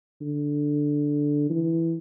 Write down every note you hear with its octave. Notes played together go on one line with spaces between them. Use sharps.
D3
E3